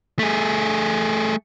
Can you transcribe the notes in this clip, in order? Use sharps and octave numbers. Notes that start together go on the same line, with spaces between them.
A3 G#4